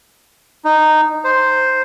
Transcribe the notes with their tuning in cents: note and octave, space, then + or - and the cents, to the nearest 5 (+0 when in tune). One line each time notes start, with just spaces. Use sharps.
D#4 -10
C5 +0